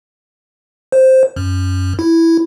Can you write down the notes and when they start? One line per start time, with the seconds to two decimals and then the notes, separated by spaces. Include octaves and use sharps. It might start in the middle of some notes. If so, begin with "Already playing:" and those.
0.92 C5
1.36 F#2
1.99 E4